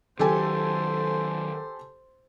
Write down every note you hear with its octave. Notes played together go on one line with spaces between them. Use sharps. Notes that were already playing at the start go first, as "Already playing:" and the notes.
D#3 F#3 G4 A4 C5 G#5